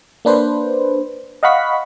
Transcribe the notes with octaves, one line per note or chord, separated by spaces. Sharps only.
A#3 D4 B4 C5
D#5 F5 F#5 B5 C#6 B6